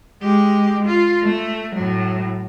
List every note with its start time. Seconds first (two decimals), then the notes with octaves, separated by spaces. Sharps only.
0.23 G#3 G4
0.85 F4
1.23 A3
1.75 A2 F#3